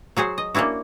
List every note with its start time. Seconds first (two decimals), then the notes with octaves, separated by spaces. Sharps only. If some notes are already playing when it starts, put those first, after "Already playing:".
0.17 F#3 F#4 G#4 C5
0.38 D#5
0.55 A#3 C#4 D4 E4 F#4